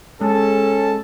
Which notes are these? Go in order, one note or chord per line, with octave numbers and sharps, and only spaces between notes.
G#3 C#4 A4 A5